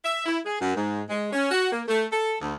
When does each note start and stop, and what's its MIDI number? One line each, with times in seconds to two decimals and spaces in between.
0.05 0.23 76
0.26 0.39 64
0.45 0.60 68
0.61 0.74 42
0.76 1.03 44
1.10 1.30 56
1.33 1.50 61
1.51 1.69 66
1.72 1.83 58
1.88 2.06 57
2.12 2.34 69
2.42 2.54 38